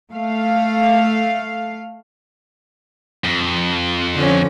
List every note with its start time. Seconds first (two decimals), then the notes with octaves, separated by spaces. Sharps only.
0.13 A3 F5
3.24 F2
4.16 D3 F3 C#4